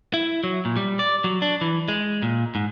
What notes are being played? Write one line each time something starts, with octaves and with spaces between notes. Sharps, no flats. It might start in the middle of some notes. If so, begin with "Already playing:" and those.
E4
F#3
A#2
G3
D5
F#3
D4
E3
G#3
A#2
G#2